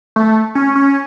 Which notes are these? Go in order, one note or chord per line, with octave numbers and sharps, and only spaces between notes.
A3
C#4
C#4